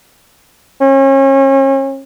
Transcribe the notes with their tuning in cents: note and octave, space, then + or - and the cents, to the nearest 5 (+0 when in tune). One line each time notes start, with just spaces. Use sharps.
C#4 -35